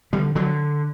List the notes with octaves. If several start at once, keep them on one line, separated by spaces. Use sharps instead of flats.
D3 G3
D3 F#3